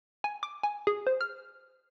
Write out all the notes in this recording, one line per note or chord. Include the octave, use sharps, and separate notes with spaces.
G#5
D6
G#5
G#4
C5
F6